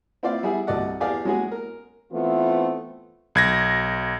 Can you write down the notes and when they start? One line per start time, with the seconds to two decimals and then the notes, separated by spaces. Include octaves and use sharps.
0.23 C4 E4 F4 C5 D5 F5
0.43 G3 B3 E4 G#4
0.67 C2 F#4 A4 D5 D#5 F#5
1.00 E2 G4 G#4 D5 F5
1.24 F#3 G#3 B3 C#4 F#4 G#4
1.51 A#4
2.12 E3 A3 B3 C4 F4
3.35 B1 G#6 A#6